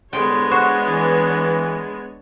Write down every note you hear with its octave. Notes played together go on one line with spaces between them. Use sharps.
C2 D3 G#3 B3 D4 C#5 G5 C6
F#4 C5
E3